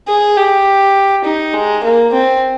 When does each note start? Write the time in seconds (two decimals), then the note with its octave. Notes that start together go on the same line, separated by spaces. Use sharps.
0.08 G#4
0.37 G4
1.25 D#4
1.54 G#3
1.84 A#3
2.13 C4